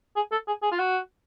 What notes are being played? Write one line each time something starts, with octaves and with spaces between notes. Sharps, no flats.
G#4
A4
G#4
G#4
F4
F#4